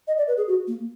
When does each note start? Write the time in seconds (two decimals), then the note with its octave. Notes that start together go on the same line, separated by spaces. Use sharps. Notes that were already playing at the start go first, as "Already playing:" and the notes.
0.08 D#5
0.18 D5
0.28 B4
0.37 G#4
0.48 F#4
0.67 A#3